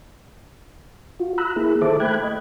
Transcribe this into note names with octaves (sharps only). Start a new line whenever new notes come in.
F4 F#4
A#5 B5 E6 F#6
A#3 E4 G#4
D#3 A4 C5 E5 A5 D6
A3 G5 B5 F#6 G#6
D#5